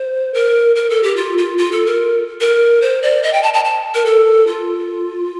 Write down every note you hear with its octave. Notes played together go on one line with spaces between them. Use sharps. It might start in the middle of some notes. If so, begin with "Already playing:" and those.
Already playing: C5
A#4
A#4
A4
G4
F4
F4
F4
A4
A#4
A#4
C5
D5
D#5
G5
A5
A5
A5
A#4
A4
F4